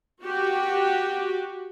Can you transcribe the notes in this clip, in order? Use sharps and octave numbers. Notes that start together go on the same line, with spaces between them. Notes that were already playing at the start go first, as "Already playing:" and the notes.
F#4 G4